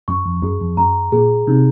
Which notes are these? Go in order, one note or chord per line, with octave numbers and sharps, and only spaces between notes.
F#2 C#6
F2
F#2 G#4
F2
F#2 A#5
A#2 G#4
C3 D#4